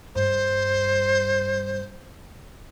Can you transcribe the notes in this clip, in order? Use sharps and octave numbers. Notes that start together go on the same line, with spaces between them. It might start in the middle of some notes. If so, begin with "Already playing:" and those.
G2 C5